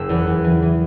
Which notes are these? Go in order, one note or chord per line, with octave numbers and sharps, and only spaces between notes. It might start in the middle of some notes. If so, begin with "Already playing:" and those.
Already playing: F#1 E6
E2
F#6
E2
E3
E3